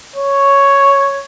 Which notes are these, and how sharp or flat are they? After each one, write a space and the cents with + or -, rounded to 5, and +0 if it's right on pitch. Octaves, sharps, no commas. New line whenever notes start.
C#5 +0